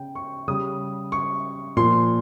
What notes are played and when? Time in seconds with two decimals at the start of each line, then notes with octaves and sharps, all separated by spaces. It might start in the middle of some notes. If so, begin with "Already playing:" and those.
Already playing: C#3 G5
0.15 C#6
0.48 C#3 G3 D#6
1.12 C#6
1.77 A#2 F3 C6